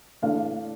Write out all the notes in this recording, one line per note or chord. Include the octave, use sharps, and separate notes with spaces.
A2 A3 D4 F5